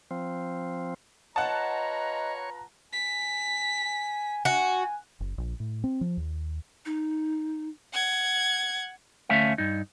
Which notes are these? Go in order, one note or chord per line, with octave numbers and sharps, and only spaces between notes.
F3 C4
F4 B4 C#5 D#5 F#5 A5 A#5
G#5 B6
G#5
F#4 G#5
F#1
A#1
A2
C4
F3
D#2
D#4
F#5 G#6
D2 A3 C#4 E5 F5
G2 D#4